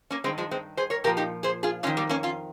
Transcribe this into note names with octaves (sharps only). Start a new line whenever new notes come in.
A#3 C#4
G2 D#3 G#3 C4
F3 G#3
G#3 C4
G#4 C5
A#4 C#5
A#2 F3 G4 A#4
D#4 G4
G#4 C5
F4 G#4
F2 D#3 C#4 F4
G3 A#3
A#3 C#4
C#4 F4